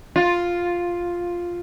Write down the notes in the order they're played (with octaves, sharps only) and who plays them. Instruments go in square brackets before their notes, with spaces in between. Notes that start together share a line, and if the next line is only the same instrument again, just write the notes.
[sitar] F4